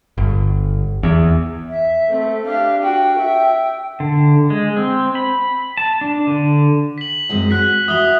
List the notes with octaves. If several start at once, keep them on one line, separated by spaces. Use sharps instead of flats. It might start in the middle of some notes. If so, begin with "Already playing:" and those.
G1
E2
E5
A3 C4
D4 G4 F5
F#4 G5
E5
D3
G#3
C4
B5
A5
D4
D3
B6 F#7
F#2 G#3 C4
F#4 F#6 B6
E4 F#4 D#6 G7